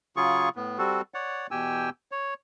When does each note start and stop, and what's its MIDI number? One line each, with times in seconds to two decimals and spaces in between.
0.17 0.49 49
0.17 0.49 54
0.17 0.49 65
0.17 0.49 68
0.17 0.49 85
0.56 0.78 45
0.56 0.78 59
0.78 1.01 55
0.78 1.01 60
0.78 1.01 66
0.78 1.01 69
1.14 1.47 73
1.14 1.47 74
1.14 1.47 78
1.51 1.90 40
1.51 1.90 47
1.51 1.90 67
1.51 1.90 79
1.51 1.90 80
1.51 1.90 88
2.12 2.34 73